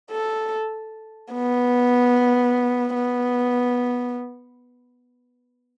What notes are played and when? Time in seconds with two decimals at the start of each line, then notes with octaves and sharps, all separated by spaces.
0.11 A4
1.33 B3
2.95 B3